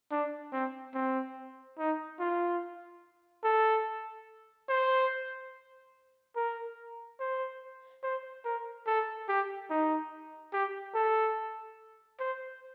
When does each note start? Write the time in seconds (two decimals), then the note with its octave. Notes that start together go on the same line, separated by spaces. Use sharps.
0.11 D4
0.52 C4
0.94 C4
1.78 D#4
2.20 F4
3.44 A4
4.69 C5
6.36 A#4
7.20 C5
8.03 C5
8.45 A#4
8.87 A4
9.28 G4
9.70 D#4
10.53 G4
10.95 A4
12.20 C5